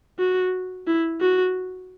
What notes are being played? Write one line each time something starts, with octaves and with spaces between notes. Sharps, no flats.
F#4
E4
F#4